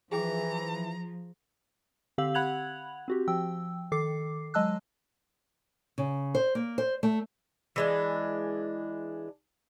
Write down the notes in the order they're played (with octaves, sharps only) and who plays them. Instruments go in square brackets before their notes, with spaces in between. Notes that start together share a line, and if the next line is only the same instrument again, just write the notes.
[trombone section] E3 [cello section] F3 [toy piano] G#4 G5 D6 [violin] A#5
[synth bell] D3 C4 G4 F5 E6 F#7
F#5 B5 F#6 G#6 F7 F#7
C4 F#4 G4
F3 G5 E6
D#3 A4 D6 C7
F#3 G#3 D#5 A5 E6 F#6
[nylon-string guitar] C#3
C5
A#3
C5
A3
[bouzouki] E3 G#3 D4